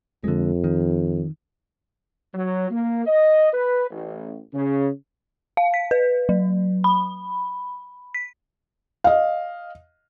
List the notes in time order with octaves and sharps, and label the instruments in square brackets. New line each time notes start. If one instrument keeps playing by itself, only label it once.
[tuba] F2 [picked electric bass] D3 G#3
[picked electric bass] D#3
[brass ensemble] F#3
A#3
D#5
B4
A1
C#3
[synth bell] F5
B6
B4
F#3
B5
B6
[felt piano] D#5 F5